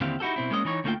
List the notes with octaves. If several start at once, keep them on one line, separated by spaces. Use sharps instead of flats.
D#2 D3 C4 E4 G4 F5
D#4 E4 F#4 G4 A4
B2 C4 E4
G#3 A#3 C#4 D#5
E3 D#4 C#5
D2 A3 A#3 C4 F4 G5